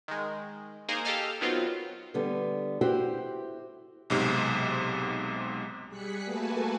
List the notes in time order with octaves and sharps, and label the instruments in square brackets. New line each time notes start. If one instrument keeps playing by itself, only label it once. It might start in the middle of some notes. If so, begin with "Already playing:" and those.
[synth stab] D#3 G#3
A#3 D#4 G#4 A#4 C5
G4 A4 D#5 F5 F6
D#3 F#3 B3 C4 F4
[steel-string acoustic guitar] D3 G3 B3
E4 F#4 G4 C5 G5
[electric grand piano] B1 G#2 C3
[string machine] G3 G#4 F#6 B6 C#7
A3 A#3 F#4 B4 G#5 A5